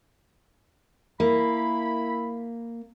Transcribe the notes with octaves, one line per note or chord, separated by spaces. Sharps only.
A#3 E4 B5